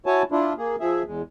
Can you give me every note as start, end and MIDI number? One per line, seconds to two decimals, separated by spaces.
0.06 0.23 64
0.06 0.23 66
0.06 0.23 73
0.06 0.23 80
0.06 0.23 81
0.32 0.53 62
0.32 0.53 64
0.32 0.53 65
0.58 0.76 58
0.58 0.76 68
0.80 1.03 53
0.80 1.03 68
0.80 1.03 76
1.06 1.22 40
1.06 1.22 56